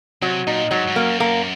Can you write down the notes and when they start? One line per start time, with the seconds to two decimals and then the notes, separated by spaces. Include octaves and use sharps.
0.22 C3 F#3
0.47 A#2 D#4
0.71 G#2 F#3
0.87 G#2
0.96 F#2 A#3
1.20 A#3